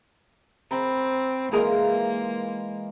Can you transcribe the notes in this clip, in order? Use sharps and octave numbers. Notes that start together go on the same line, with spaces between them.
C4 A#4 B5
E3 G#3 A#3 F4 G#4 A#4